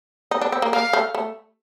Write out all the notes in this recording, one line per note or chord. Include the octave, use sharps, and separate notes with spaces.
D#4
D4
C4
A#3
A#3 F5
A3
A3